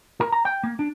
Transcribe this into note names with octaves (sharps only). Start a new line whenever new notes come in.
A#4
A#5
G5
A#3
D4